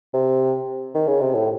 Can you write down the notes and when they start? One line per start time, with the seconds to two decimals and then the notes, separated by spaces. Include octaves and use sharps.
0.14 C3
0.95 D#3
1.08 C#3
1.21 C3
1.35 A2